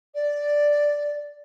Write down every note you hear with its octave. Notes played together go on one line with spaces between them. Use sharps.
D5